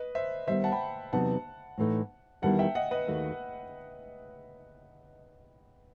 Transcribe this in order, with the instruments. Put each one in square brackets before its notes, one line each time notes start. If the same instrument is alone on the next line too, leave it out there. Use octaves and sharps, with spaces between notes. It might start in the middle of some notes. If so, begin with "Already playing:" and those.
Already playing: [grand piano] B4 D#5
C5 E5
[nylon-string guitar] D#3 G3 B3 [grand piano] C5 E5
[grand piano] F#5 A5
G5 B5
[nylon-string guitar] E2 C3 F#3 B3 D#4 [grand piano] F#5 A5
[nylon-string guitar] A2 E3 A3 D#4
[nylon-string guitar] E2 D#3 G3 B3 E4 [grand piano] F#5 A5
[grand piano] E5 G5
D#5 F#5
B4 D#5
[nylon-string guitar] D#2 D#3 A3 D#4 F#4